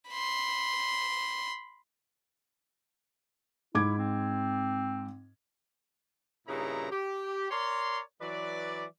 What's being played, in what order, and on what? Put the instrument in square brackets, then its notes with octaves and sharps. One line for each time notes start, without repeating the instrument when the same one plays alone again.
[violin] B5 C6
[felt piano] G#2 D6 G#6 [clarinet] E4
[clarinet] C4
[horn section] G2 A#2 C#3 D#4 E4 A#5
G4
A#4 C#5 D5 A#5 C6
E3 F#3 B4 D5